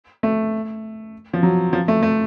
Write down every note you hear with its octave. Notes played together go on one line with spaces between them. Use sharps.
A3
F3
F#3
F3
A3
A3